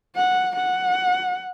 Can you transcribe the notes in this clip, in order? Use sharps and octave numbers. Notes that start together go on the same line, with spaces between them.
F#5
F#5